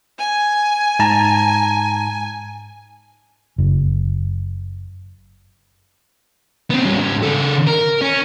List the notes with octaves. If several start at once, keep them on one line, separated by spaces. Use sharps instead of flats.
G#5
G#2 A5 A#5
F#1
B3 C4
G3 C#4
G#2 C#4
C#3 A4
A#4
C#4